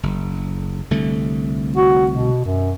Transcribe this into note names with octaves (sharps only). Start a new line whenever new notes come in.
F#1
C2 D3 A3
F#4
B2
F#2